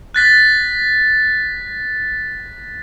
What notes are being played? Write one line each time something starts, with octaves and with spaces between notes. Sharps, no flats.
F#6 A6 B6